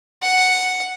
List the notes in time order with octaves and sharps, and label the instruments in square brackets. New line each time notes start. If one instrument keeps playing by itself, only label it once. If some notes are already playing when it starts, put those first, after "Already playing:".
[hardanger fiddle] F#5